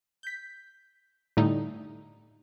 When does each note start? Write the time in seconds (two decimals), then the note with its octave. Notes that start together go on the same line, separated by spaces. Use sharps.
0.23 G6 B6
1.37 A2 D3 G3 A3 D#4